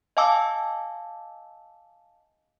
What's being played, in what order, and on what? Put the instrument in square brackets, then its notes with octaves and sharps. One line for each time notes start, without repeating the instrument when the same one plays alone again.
[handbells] D#5 F5 G#5 A5 D6 E6